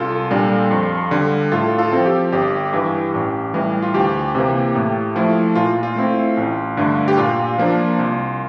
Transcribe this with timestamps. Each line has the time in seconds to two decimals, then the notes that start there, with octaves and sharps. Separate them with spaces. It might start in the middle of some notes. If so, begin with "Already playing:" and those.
Already playing: C2 F4 A4
0.30 A#2 G3 D4
0.71 F2
1.11 D3 G3
1.52 A2 F4 A4
1.78 F4 A4
1.92 F3 C4
2.06 G4
2.32 G1 G4
2.73 G2 E3
3.13 A1
3.54 A2 E3 G3
3.82 F4
3.94 D2 G4
4.35 C3 E3 A#3
4.75 A2
5.16 F3 A3 E4
5.55 A#2 F4
5.83 F4
5.96 A3 C4 E4
6.37 A1
6.77 G2 D3 A3 D4
7.08 G4
7.17 A#2 F4
7.58 F3 A#3 D4
7.99 C2